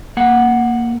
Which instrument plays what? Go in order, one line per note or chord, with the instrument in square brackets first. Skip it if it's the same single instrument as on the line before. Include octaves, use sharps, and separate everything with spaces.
[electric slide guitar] A#3 F#5